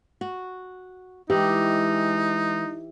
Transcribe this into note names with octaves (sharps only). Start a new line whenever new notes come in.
F#4
E3 G#3 D#4 G4